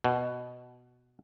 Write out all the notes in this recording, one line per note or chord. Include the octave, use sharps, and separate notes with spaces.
B2